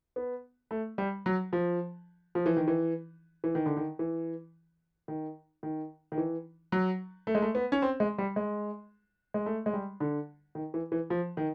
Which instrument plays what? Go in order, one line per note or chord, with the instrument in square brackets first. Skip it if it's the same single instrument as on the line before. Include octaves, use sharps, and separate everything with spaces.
[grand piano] B3
A3
G3
F#3
F3
F3
E3
D#3
E3
E3
D#3
D3
D#3
E3
D#3
D#3
D#3
E3
F#3
A3
G#3
A3
B3
C#4
C4
G#3
G3
G#3
G#3
A3
G#3
G3
D3
D#3
E3
E3
F3
D#3